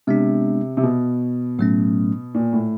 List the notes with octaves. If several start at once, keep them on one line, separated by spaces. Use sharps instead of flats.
C3 G#3 B3 D4
C3
B2
A2 F#3 A3 C#4
A#2
A2